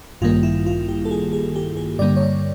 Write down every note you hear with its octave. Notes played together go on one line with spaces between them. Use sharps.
A1 G2 D#3 G3 A#3 F4
E4
F4
G4
A4
G#4
G#4
G4
G#4
G2 D3 G3 A#3 D5
C#5
D5